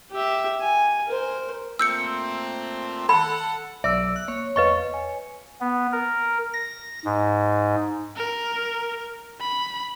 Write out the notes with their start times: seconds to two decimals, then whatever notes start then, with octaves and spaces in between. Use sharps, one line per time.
0.12 G4 E5
0.61 G#5
1.06 A#4 C5
1.79 A#2 A3 C4 E6 G6 C#7
3.09 A4 F#5 B5
3.84 B1 D5 E5 E6
4.16 F#6
4.28 A#3 C#5
4.56 G1 E2 B4 C#5 D#5 F5 C#6
4.94 G#5
5.61 B3
5.92 A#4
6.53 A#6
7.05 G#2
8.17 A#4
9.41 B5